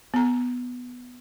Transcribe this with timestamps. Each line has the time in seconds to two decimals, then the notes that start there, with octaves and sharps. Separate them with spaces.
0.14 B3 A#5